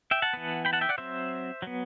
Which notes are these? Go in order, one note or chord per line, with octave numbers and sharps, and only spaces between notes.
E5 G5
F#5 A5
E3 B3
G5 B5
F#5 A5
E5 G5
D5 F#5
F#3 C4 C5 E5
F#3 B3